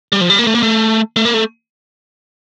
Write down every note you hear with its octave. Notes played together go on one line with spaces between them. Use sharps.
G3
F3
G3
A#3
A3
A#3
A3
A3
A#3
A3